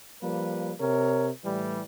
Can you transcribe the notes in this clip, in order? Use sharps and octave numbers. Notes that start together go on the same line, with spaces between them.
F3 G3 A#3 B4
C3 A#4 C#5
A2 E3 G3